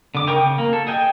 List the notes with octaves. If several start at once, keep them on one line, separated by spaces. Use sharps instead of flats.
D3 D6
C#3 D#4 A#4 G5 C#6
C#3
A#3
A4
G#4 D#5 G5 G#5